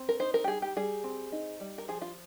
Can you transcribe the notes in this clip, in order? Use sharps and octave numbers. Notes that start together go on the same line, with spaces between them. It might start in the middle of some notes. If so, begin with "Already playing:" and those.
Already playing: C4
A#4
D#4 C5
A#4
G4
G3 G#4
G4
G3 G#4
C4
D#4
G3
A#4
F3 G#4
F4